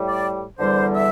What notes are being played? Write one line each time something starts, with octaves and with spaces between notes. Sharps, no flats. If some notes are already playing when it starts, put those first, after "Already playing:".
Already playing: A2 G3
D5
E2 D3 G3 C5
E5